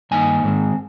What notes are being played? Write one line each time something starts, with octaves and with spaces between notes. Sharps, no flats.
G2 D#3 A#3 D#4 G#5
G#2 D#3 G#3 C4